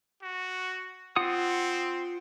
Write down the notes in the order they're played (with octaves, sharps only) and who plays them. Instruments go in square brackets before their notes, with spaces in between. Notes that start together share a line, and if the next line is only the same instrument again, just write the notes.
[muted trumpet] F#4
[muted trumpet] C4 [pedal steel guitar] F4 F#5 D#6